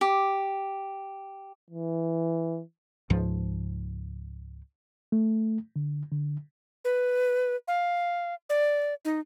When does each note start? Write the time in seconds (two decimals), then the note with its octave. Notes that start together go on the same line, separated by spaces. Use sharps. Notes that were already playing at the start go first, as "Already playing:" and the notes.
0.01 G4
1.70 E3
3.10 C#2 G#2 F3
5.12 A3
5.76 D3
6.12 D3
6.85 B4
7.68 F5
8.50 D5
9.05 D#4